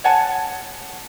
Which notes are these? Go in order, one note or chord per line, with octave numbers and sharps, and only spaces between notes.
C#5 F#5 G#5 A5